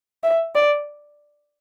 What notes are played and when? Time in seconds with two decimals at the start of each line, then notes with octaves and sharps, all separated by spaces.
0.24 E5
0.55 D5